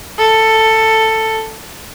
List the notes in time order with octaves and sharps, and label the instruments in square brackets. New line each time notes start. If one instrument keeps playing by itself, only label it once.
[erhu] A4